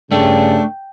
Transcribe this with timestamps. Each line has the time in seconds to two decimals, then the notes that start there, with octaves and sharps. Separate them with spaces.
0.11 G2 C#3 A3 D4 G5